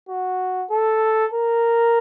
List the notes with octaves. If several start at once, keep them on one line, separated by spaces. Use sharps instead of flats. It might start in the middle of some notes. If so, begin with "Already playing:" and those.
F#4
A4
A#4